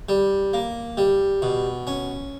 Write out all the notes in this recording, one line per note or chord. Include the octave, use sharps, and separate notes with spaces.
G3
A#3
G3
B2
C#4